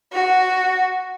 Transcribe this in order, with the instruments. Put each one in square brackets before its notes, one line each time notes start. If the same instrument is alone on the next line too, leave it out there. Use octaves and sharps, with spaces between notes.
[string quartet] F#4